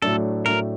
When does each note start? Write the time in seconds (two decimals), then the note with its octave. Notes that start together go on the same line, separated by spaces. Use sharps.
0.02 A2 F#3 A3 D4 A4
0.45 A2 F#3 A3 D4 A#4